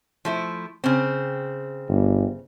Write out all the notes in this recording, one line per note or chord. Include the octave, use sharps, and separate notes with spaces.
F3 A3 E4
C#3 C4
G1